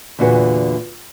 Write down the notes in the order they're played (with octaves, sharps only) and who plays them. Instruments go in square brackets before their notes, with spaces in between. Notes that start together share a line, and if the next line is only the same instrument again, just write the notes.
[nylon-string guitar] E2 A#2 D3 F#4 G#4 B4